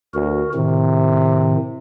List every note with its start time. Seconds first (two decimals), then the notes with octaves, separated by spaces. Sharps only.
0.14 D2 F#4 A#4
0.55 A2 C3 D#3